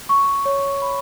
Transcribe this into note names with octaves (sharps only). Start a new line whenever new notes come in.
C#6
C#5
B5